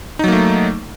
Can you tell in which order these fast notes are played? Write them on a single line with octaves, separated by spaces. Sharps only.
D#4 F#3 A#3 A3